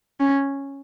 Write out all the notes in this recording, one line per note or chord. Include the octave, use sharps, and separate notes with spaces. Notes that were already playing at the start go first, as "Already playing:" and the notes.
C#4